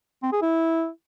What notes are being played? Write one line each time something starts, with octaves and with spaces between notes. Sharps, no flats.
C4
G#4
E4